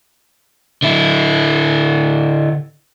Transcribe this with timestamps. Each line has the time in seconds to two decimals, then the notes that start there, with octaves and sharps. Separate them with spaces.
0.83 D3 E4